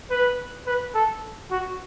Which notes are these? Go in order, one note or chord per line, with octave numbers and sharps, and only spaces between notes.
B4
B4
A4
F#4